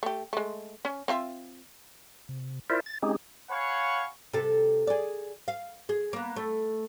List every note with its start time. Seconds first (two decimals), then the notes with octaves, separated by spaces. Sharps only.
0.03 A3 G4
0.33 G#3 A3
0.85 C#4
1.08 C4 F4 E5
2.29 C3
2.70 E4 F4 A#4 C5 D5 E5
2.86 A6
3.03 G#3 C4 C#4 D#4 G4 G#4
3.50 C#5 F5 F#5 G#5 B5 C#6
4.33 C3 A4
4.87 G#4 D5
5.48 F5
5.89 G#4
6.13 A#3 B3
6.36 A3